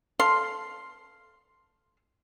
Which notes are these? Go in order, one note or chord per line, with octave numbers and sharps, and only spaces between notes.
A4 F5 C6